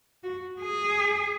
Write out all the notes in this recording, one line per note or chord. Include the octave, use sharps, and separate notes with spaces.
F#4
G#4